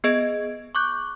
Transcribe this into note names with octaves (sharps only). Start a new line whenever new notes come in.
B3 G#4 D#5 G#6 D7
C#6 D6 F#6 G6